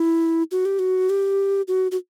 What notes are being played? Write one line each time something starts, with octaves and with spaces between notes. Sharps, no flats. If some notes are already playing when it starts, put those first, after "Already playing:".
Already playing: E4
F#4
G4
F#4
G4
F#4
F#4